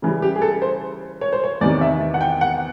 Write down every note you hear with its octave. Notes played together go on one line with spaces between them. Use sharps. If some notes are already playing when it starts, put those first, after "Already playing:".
C#3 E3 G3
G4
G#4
A4
C5
C#5
C5
C#5
E2 C3 D#3 D5
E5
F#5
G5
F#5